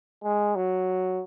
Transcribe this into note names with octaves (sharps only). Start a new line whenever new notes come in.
G#3
F#3